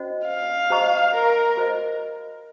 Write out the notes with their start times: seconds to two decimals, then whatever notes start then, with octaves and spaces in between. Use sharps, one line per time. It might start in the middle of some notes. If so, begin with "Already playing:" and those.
Already playing: C#4 F#4 C5 D#5
0.27 F5
0.70 F#4 C5 D#5 A#5 C#6
1.14 A#4
1.57 F#4 C5 D#5